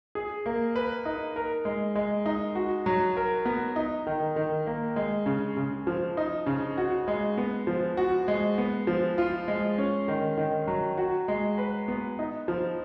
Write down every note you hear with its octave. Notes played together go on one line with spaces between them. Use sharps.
G#4
A#3
B4
D#4
A#4
G#3
G#3
D#4
F#4
F#3
A#4
B3
D#4
D#3
D#3
A#3
G#3
C#3
C#3
F3
D#4
C#3
F#4
G#3
B3
F3
F#4
G#3
B3
F3
F4
G#3
C#4
D#3
D#3
F#3
F#4
G#3
B4
B3
D#4
F3